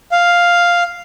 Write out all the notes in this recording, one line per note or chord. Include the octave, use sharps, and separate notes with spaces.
F5